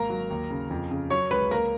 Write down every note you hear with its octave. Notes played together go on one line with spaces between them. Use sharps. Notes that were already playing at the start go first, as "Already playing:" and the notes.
Already playing: G#1 A#3 A#4 A#5
F#3
D#2
C#3
F2
C#3
F#3 C#5 C#6
C#2 B4 B5
A#3 A#4 A#5